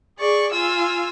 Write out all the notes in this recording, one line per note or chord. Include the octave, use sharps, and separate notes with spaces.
G#4 D5 C#6
F4 G#5 E6